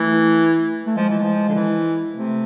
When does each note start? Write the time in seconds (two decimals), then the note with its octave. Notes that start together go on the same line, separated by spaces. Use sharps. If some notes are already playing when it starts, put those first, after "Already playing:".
Already playing: E3 A3
0.86 A3
0.96 F3 G#3
1.10 E3
1.23 F3
1.49 D3
1.55 E3
2.13 C3 A3